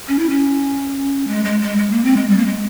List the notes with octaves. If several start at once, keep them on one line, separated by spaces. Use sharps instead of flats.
C#4
E4
C#4
G#3
G#3
G#3
G#3
A#3
C4
G#3
G3
A#3
G#3